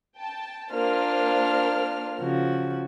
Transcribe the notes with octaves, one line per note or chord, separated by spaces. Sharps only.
G5 A5
A#3 D4 F4 C5 F6
C#3 F3 F#4